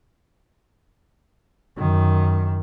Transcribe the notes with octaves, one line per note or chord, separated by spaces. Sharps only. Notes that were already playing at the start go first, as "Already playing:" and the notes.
F#2 D#3